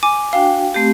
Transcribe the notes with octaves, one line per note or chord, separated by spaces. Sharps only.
G#5 D6
D4 F#4 F5 G5
A3 C4 G4